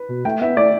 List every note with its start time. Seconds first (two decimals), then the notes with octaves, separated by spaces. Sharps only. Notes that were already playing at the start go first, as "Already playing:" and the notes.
Already playing: B4
0.09 B2
0.25 A3 G5
0.41 B3 E5
0.57 A3 D5